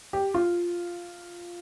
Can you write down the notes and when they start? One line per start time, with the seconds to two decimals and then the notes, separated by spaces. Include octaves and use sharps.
0.13 G4
0.34 F4